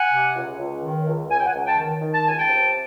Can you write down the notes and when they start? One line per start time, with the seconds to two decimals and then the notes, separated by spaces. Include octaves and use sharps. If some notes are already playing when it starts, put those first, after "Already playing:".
Already playing: F#5 G#5
0.12 C3
0.35 C#2
0.59 C#2
0.83 D#3
1.06 C#2
1.30 C#2 G#5
1.38 G5
1.46 F#5 G#5
1.54 C#2
1.66 G5 A5
1.78 D#3
2.01 D#3
2.13 A5
2.25 C#2 G#5
2.39 G5 A5
2.49 C3